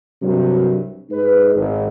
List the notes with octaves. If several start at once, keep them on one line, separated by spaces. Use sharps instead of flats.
C2 G2 C3 F#3
G#2 G#3 D#4 B4
G#1